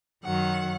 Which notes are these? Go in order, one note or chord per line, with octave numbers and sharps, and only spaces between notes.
F#2 D#3 F#3 F#5